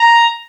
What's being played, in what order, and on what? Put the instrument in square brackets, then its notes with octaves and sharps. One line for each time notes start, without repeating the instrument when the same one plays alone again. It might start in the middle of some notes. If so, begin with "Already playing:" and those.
Already playing: [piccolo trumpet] A#5